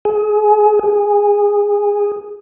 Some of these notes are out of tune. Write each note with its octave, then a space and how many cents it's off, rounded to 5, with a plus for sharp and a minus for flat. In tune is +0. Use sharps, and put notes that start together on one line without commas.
G#4 +25
G#4 -15